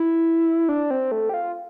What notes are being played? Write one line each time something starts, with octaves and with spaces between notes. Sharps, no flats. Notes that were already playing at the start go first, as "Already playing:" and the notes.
Already playing: E4
D4
C4
A3
G4
F4